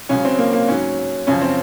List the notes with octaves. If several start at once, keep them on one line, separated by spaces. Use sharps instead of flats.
C#2 C#3 F#3 C#4
C4
A#3
A#3
G#2 F#3 C#4
F#2 C#3 F3 C#4
C4